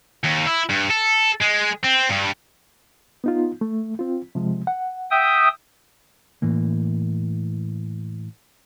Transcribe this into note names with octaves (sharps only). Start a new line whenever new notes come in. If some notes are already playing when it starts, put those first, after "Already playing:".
D#2
E4
G2
A4
G#3
C4
G2
B3 D#4 F4
A3
C4 F4
C3 F3 G#3
F#5
E5 G5 D#6
A2 E3 A#3